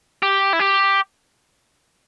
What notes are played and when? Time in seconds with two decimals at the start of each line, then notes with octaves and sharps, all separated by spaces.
0.23 G4
0.53 E4
0.60 G4